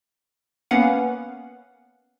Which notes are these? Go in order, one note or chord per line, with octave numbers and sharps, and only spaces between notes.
A#3 B3 C#4 B4 F5 F#5